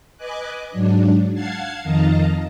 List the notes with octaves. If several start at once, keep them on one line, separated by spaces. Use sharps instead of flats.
B4 D#5 G#5 D6 F#6
G#2 F#3 D4
F5 F#5 A5 G#6 A6 C7
F2 D#3 D#5 F5 A5 A#5